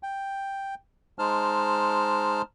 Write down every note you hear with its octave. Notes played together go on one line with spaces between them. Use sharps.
G5
G#3 D#4 C5 A5 F6